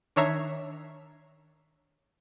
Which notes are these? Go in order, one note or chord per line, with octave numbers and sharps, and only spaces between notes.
D#3 D4 C#5 E5 A#5 C7